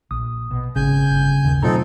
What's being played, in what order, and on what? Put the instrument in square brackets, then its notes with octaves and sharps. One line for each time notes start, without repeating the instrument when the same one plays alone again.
[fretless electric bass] A#1 [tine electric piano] D#6
[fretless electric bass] B2
[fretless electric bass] G#1 [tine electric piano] C#3 [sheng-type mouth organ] G#5 G6
[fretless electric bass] G1
D#2 D#3
[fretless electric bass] B2 F#3 A3 [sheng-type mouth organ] C4 D#4 A4 [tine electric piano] F4 A#5